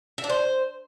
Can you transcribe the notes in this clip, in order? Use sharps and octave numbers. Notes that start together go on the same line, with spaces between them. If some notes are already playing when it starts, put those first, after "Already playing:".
E5
D4
C5